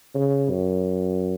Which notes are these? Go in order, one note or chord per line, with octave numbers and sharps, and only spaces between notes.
C#3
F#2